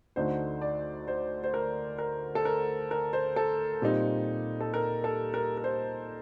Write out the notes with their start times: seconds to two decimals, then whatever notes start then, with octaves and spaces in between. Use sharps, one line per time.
0.16 D2 D3 A3 D#4 C5
0.62 D5
1.08 C5
1.44 C5
1.54 A#4
1.98 A#4
2.35 A4
2.45 A#4
2.91 A#4
3.13 C5
3.36 A4
3.82 A#2 G3 C4 D#4
4.61 A4
4.74 A#4
5.04 A4
5.34 A#4
5.57 A#4
5.64 C5